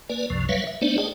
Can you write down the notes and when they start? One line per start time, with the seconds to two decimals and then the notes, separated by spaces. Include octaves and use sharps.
0.09 A#3 B4 D5 G#5
0.30 C#2 F#2 C3 F3
0.49 F#3 G3 B4 C#5 E5 F5
0.67 E5
0.81 A3 B3 D4 D#4 C5 D5
0.98 G#4 D5 D#5 G5 A5